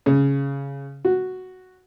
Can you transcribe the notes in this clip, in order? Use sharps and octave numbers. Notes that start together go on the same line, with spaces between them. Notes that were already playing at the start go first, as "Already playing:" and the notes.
C#3
F#4